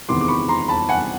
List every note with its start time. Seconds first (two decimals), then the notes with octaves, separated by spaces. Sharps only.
0.09 E2 C3 D#3 G#3 B3 C6 D6
0.21 D6
0.28 B5 C#6
0.49 A#5 C6
0.68 A5 B5
0.89 F#5 G#5